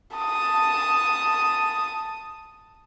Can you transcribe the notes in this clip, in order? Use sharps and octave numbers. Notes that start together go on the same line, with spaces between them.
A5 D#6